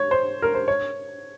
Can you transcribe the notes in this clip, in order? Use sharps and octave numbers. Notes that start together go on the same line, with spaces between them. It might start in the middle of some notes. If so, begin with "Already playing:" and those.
Already playing: C#5
C5
A#4
C5
C#5